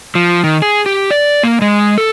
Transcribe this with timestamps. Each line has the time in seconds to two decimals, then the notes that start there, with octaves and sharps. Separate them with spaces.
0.15 F3
0.44 D#3
0.62 G#4
0.86 G4
1.11 D5
1.43 A#3
1.61 G#3
1.98 A4